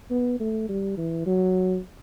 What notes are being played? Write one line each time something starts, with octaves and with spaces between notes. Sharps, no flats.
B3
A3
G3
E3
F#3